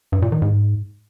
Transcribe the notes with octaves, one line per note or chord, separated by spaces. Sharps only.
G2
A#2
D#3
G#2